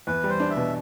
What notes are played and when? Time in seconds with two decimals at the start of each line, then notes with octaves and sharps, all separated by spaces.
0.07 E2 B4
0.24 G3
0.29 C5
0.40 D4
0.50 E5
0.57 B2